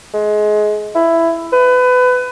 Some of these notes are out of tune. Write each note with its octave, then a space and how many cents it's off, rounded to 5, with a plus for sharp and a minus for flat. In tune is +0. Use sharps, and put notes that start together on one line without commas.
G#3 +25
E4 +10
B4 +25